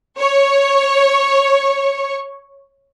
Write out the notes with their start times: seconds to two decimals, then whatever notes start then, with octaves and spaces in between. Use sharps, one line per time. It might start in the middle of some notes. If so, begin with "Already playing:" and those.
0.18 C#5 C#6